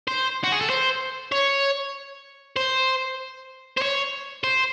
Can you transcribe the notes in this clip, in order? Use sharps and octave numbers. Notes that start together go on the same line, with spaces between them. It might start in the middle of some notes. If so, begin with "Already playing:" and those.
C5
F#4
G#4
A4
C5
C#5
C5
C5
C#5
C5